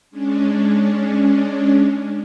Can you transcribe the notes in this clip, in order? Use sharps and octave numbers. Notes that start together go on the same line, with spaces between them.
G#3 C#4 D4